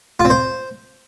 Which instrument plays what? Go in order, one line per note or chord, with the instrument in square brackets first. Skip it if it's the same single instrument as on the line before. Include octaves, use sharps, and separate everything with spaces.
[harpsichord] F4
C4
C5